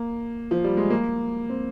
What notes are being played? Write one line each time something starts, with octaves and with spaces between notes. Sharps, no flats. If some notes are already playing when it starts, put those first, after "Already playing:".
Already playing: A#3
F3
G3
G#3
A#3
C4